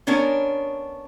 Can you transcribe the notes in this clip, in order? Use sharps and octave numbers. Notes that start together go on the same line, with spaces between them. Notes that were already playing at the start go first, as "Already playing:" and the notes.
B3 C#4 D4 A#4 C#5